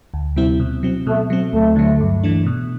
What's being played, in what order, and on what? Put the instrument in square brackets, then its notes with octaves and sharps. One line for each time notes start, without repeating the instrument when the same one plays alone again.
[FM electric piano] D2
C3 G3 C4 E4
B2
F#3 C4
[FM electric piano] B2 [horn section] A3
[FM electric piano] F#3 C4
[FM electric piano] D2 [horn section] A3
[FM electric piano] D3 F#3
G2
E3 A3 D4
B2